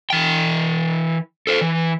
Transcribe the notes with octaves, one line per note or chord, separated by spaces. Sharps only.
E3 G5
A4 C5
E3